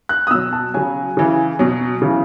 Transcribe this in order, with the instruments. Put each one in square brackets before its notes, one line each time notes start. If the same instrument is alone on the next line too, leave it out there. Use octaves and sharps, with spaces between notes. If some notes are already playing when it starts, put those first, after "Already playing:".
[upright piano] F#6
D#6
B2 F#3 E6
A5
C#3 F#3 G#5
C#3 E3
B2 F#3
C#3 E3